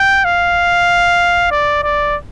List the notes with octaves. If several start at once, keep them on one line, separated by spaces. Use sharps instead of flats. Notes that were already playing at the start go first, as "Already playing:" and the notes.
Already playing: G5
F5
D5
D5